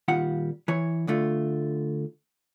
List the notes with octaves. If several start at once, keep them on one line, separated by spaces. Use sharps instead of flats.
A#2 D#3 G3 F4 F5 F#5
E3 C#5
D2 D3 A3 F4